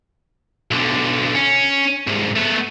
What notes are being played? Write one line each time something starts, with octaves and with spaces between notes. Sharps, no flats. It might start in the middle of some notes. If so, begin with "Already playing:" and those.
B1 D3
C#4
C2 G#2
A3 B3